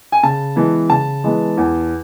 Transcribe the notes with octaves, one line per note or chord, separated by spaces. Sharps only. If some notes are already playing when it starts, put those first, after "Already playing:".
G#5
C#3 A5
E3 G#3 B3
C#3 A5
E3 G#3 B3
E2